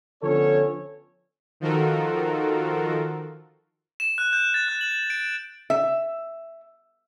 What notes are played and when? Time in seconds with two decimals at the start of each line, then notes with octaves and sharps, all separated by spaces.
0.22 D3 F3 B3 C#4 A4 C#5
1.60 D#3 F3 F4 F#4 A4 A#4
4.00 E7
4.18 F#6
4.33 G6
4.54 A6
4.68 F#6
4.81 F#7
5.10 D7
5.70 E5